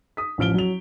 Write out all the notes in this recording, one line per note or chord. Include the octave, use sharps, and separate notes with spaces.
D#6 B6
A1 F3 F6 D7 G7
F#3 F7